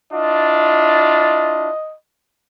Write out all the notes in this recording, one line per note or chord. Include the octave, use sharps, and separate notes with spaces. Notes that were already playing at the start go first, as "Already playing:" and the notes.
D4 E4 F4 D#5